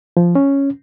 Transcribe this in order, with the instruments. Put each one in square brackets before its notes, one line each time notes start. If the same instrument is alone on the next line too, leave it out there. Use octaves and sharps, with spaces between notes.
[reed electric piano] F3
C#4